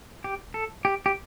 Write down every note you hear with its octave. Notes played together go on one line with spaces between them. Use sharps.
G4
A4
G4
G4